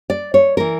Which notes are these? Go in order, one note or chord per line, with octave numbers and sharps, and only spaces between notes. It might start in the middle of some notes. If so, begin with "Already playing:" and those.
D5
C#5
E3 A#4